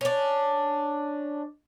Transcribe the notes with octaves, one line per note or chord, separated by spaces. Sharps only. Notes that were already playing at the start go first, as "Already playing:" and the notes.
C#4 D4